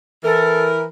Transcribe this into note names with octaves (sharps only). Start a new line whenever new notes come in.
E3 A4 A#4